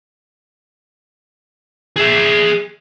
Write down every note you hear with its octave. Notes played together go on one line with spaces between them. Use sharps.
G#4 E5